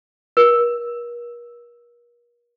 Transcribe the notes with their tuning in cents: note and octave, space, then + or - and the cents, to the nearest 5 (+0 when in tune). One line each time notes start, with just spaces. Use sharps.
A#4 +40